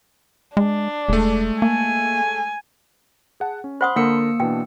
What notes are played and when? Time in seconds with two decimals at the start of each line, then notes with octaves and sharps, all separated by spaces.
0.57 G#3 D4
1.08 E1 G#3 A3
1.62 A#3 G#5
3.40 G#4 F#5 A5
3.64 C#4
3.81 C5 F#5 B5 C6 D#6
3.96 D3 A#3 A#4 F#5 A5 E6 C#7
4.40 B2 E3 D4 G5